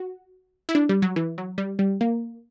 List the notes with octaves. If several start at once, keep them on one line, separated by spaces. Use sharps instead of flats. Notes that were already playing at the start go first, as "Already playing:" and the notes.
Already playing: F#4
E4
D4
G3
F#3
E3
F#3
G3
G3
A#3